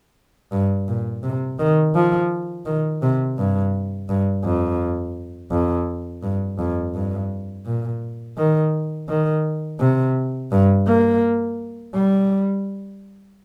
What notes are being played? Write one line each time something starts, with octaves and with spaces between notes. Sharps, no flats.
G2
A#2
C3
D#3
F3
D#3
C3
G2
G2
F2
F2
G2
F2
G2
A#2
D#3
D#3
C3
G2
A#3
G3